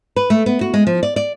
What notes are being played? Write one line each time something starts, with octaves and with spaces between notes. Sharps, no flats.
B4
A3
B3
F#4
G#3
F3
D5
D5